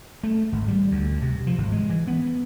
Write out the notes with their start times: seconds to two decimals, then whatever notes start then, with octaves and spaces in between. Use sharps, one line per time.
0.23 A3
0.52 G#1
0.68 G3
0.91 D2
1.22 C3
1.47 F3
1.58 G#1
1.72 G#3
1.90 E3
2.07 B3